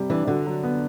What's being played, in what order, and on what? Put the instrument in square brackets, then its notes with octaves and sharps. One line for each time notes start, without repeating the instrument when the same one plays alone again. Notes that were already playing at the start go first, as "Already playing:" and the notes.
Already playing: [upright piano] C3 G3
[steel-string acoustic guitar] E3 [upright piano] D4
[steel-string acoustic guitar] D3 [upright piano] F#4
[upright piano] F#3
B3